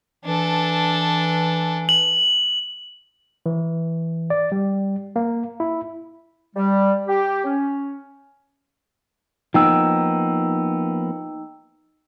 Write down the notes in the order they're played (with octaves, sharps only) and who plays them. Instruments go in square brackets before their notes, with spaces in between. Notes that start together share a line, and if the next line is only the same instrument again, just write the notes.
[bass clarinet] E3 [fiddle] D4 A4
[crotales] F#7
[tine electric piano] E3
D5
G3
A#3
E4
[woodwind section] G3
G4
C#4
[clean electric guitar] F3 A#3 B3 [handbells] D#4 G5 E6